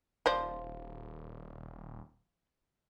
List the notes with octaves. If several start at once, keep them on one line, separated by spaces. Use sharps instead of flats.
D#1 F3 C5 D5